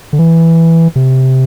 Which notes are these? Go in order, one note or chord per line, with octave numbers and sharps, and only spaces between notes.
D3
E3
C3